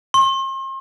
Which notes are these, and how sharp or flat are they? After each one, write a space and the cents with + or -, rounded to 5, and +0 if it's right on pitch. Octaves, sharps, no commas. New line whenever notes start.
C6 +40